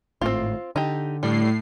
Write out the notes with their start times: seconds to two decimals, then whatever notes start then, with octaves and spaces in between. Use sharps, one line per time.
0.21 G#1 A2 C4 F4
0.76 D3 D#4 G4
1.23 A2 G3 C7